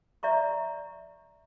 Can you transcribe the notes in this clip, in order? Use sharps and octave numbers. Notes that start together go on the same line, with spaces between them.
D5 E5 A#5 C#6